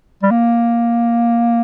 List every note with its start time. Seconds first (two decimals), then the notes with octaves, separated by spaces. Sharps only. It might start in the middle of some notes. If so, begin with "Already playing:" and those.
0.23 G3
0.31 A#3